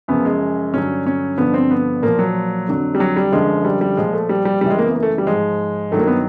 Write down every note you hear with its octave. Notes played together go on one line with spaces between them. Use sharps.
F#2 C#3 F3 B3
G#3
G2 D3 F#3 C#4
C#4
G2 D3 F3 B3
C4
B3
A#2 F3 A#3
F#3
F2 D3 F#3
G3
F#3
G3
F#2 D3 F3 G#3
G3
G3
A#2 F3 G#3
A3
G3
G3
F#2 C#3 E3 G3
G#3
A#3
B3
A#3
A3
G3
G#2 F3 G#3
G2 D#3 F#3 A3
A#3
B3